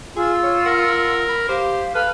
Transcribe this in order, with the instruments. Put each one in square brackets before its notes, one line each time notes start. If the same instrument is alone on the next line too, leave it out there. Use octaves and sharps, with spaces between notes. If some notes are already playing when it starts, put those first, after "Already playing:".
[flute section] F4 C6 E6 [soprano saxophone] G#4
[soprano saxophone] C#5
[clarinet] A#4 [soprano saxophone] F#5
[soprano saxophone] B5
[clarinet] G4 [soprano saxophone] C5 [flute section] F5
[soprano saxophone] A4 [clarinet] B4 [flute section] F5 F6